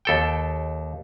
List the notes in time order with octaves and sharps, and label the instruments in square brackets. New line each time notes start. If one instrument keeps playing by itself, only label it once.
[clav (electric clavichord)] D#2 A4 G5